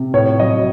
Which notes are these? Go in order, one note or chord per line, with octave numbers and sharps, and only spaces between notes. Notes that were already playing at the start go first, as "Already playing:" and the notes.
Already playing: C3
A2 C#5
F#3 D#5